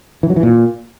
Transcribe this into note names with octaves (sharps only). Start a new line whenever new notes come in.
E3
F#3
E3
A#2